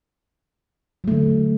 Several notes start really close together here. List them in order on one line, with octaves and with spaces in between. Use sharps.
F#3 A3 D3